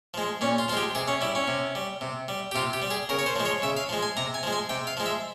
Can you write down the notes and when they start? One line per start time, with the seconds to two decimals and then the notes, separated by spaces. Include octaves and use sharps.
0.14 F3 G#3
0.41 A#2 C#4
0.58 F4
0.68 F3 F4
0.72 G#3 G4
0.95 C3 G#4
1.08 C#4
1.21 G3 E4
1.35 C#4
1.48 C3
1.75 G3
2.01 C3
2.28 G3
2.52 G4
2.55 C3 F4
2.73 G4
2.82 G3
2.91 G#4
3.09 C#3 A#4
3.19 C#5
3.26 C5
3.36 F3 G#3
3.45 C#5
3.62 C#3 E5
3.77 F5
3.89 F3 G#3
4.03 G#5
4.17 C3 A#5
4.34 G#5
4.43 F3 G#3
4.53 G#5
4.69 C3 G5
4.87 F5
4.97 F3 G#3
5.06 E5